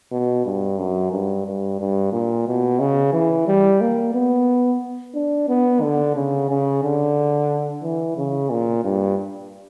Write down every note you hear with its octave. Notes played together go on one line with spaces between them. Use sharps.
B2
G2
F#2
G2
G2
G2
A#2
B2
C#3
E3
G3
A#3
B3
D4
B3
D3
C#3
C#3
D3
E3
C#3
A#2
G2